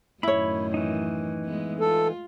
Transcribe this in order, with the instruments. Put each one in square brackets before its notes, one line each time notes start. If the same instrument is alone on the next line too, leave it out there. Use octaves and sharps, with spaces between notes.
[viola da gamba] F#2 A2 D#3 [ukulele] E4 C#5 [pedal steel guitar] B5
[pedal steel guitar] E3 D#4
[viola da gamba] G#3 B3
[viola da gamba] F4 [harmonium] A4